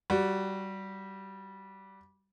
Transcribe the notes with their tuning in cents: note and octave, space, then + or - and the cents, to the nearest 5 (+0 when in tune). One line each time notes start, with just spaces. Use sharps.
G3 -15 F#4 +0